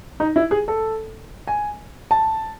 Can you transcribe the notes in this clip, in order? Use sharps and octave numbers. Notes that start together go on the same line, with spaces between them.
D#4
E4
G#4
A4
G#5
A5